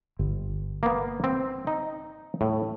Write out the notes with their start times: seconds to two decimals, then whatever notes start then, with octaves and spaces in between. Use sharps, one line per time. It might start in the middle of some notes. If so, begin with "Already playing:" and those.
0.19 G1
0.83 A#3 B3
1.24 C4
1.67 D#4
2.41 A2